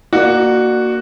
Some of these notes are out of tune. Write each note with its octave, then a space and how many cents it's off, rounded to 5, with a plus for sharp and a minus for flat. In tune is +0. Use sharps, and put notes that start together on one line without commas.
A#3 +0 D4 +25 F#4 +0